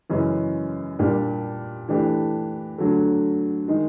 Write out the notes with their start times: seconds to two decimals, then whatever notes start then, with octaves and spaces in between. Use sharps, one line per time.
0.10 F#2 C#3 E3 G#3 C#4
0.99 A#2 G3 A#3 D4 G4
1.89 E3 A3 D4 G4
2.78 D3 F#3 A3
3.68 D#3 G#3